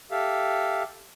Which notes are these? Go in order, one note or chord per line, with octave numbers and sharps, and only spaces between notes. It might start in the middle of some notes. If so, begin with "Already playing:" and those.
G4 A4 E5 F5